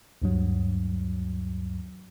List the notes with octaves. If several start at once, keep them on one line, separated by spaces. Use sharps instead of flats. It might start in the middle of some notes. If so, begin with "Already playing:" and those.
D2 G2 F#3